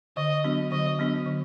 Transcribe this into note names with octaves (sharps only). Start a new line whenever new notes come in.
D3 D#5
F#3 B3 D4 F#4
D3 D#5
F#3 B3 D4 F#4
D3